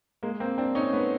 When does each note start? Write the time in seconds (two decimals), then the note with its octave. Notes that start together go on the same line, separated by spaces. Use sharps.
0.23 G#3 A#3
0.40 A#3 C4
0.58 C4 D4
0.75 C#4 D#4
0.92 A3 B3